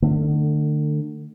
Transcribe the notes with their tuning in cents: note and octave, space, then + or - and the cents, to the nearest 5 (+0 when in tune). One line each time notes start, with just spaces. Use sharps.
D3 +35 A3 +25